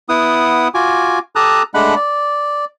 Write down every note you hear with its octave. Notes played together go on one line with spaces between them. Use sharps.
B3 E4 F#5 D#6
F4 F#4 G#5 D6
G4 A4 A5 A#5 D#6 F#6
G#3 A3 D4 F#5 B5 F#6
D5